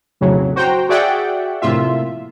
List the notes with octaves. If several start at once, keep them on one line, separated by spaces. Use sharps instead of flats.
B1 F2 A2 C#3 F#3
F#4 C5 G5 A#5
F#4 G#4 D5 E5 F#5 G5
A#1 A2 C3 A#3 F4 E5